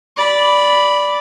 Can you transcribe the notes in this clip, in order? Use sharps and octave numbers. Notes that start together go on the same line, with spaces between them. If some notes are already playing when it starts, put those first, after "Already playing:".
D5 B5